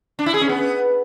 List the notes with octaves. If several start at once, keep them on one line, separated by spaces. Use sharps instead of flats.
D4
E4
G#4
C#4
B3